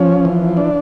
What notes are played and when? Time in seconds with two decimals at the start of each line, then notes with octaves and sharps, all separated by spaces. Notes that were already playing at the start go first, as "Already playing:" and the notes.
Already playing: F3 C#4
0.25 E3
0.57 D4